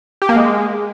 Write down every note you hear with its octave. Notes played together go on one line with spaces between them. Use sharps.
G4
A#3
G#3